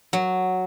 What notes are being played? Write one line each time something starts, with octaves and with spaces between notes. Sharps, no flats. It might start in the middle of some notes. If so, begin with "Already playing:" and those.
F#3